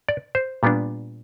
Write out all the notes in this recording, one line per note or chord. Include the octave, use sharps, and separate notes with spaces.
D5
C5
A#2 G3 B3 D4